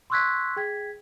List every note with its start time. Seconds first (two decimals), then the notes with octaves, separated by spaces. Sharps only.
0.10 C6 C#6 E6 F#6 G#6 B6
0.56 G#4 G5 G#6 B6